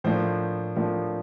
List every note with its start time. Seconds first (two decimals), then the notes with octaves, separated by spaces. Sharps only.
0.04 A2 F3 A#3 D4 C5
0.76 A2 F3 A#3 D4